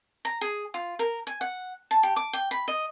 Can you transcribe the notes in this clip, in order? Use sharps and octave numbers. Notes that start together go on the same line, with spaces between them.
A#5
G#4
F4
A#4
G#5
F#5
A5
G4
D6
G5
B5
D#5